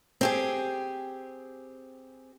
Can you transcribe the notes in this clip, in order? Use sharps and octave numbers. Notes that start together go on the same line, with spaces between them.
C4 G4 G#4